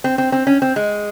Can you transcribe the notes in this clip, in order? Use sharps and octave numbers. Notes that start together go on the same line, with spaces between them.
C4
C4
C4
C#4
C4
G#3